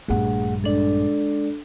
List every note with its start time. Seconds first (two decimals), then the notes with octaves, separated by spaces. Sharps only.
0.08 A#1 G2 A3 G#4 F#5
0.64 G#3 D4 A4 D5